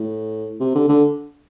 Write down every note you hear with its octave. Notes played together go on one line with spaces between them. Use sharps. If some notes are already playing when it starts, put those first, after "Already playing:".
Already playing: A2
C3
D3
D3